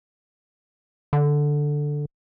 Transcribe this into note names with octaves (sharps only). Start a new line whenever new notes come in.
D3